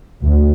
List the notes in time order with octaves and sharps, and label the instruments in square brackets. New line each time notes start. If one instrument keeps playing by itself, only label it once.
[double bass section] D2